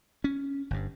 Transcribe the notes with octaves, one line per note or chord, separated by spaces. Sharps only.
C#4
G1 G2